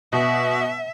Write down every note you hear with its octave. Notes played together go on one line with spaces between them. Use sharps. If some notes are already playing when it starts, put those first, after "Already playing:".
B2 E5